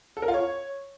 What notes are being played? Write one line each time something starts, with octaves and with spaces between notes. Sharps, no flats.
A4
A#4
F4
C#5